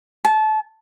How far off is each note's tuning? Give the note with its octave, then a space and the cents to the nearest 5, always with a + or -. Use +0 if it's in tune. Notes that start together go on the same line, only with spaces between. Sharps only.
A5 -25